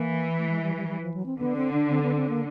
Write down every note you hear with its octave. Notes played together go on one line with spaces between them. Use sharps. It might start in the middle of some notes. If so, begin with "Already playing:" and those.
Already playing: E3 A#3
A3
G#3
G3
G3
G3
F3
F#3
C4
D3 B3
C4
D4
C4
B3
C4
A#3